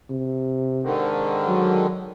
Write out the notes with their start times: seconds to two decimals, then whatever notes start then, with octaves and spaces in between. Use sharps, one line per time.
0.11 C3
0.83 G#2 D3 D#3
1.47 F#3